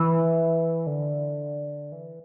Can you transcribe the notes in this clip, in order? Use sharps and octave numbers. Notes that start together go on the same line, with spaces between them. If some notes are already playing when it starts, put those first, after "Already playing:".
Already playing: E3
D3
E3